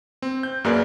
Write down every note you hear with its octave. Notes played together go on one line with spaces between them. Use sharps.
C4
G6
F#2 A#3 G#4 A#4 B4 D5